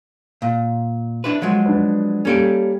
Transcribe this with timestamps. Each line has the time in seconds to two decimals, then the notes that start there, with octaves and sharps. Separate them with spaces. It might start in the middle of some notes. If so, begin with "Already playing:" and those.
0.42 A#2
1.24 D4 E4 B4
1.42 F3 F#3 G#3
1.66 D4 B4
2.25 G3 A#3 C#4 A4 G5